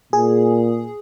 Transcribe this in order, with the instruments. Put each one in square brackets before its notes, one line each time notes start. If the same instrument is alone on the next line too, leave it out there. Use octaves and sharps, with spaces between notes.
[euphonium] A#2 [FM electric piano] G#4